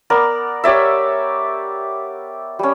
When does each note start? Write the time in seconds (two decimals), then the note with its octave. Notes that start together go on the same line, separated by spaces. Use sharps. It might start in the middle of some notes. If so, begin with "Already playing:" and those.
0.10 B3 A#4 D5
0.64 G4 C#5 D5 E5
2.59 G3 C#4